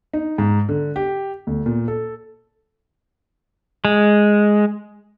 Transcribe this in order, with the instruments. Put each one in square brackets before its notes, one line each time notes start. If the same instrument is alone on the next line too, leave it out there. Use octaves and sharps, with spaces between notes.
[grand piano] D#4
G#2
D3
G4
D2
A#2
A4
[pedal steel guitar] G#3